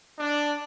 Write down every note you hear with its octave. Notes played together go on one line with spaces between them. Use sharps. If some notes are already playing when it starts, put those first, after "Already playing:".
D4